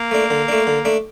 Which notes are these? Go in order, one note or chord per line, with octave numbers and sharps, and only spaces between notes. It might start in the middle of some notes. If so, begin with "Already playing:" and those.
Already playing: A#3
A3 D4
D3
A3 D4
D3
A3 D4